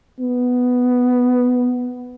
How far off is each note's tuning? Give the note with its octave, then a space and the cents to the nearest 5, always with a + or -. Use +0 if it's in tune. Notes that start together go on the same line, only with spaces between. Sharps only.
B3 +5